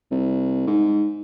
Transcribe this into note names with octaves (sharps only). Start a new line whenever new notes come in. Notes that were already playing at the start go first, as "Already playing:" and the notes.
C2
G#2